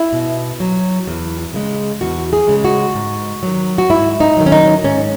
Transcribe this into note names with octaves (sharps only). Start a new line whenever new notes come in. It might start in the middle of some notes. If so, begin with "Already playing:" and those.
Already playing: E4
B2
F#3
E2
C#3 G#3
E2 F#4
G#4
C#3 G#3
F#4
G#2
D#3 F#3
F#4
G#2 E4
D#4
D#3 F#3
C#4
D#4
G#2 C#4